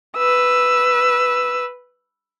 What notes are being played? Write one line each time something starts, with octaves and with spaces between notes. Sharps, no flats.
B4 E6